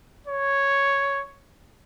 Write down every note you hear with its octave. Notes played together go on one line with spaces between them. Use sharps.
C#5